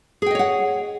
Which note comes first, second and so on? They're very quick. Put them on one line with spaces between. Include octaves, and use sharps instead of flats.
G#4 G5 D#5 C#5 F#5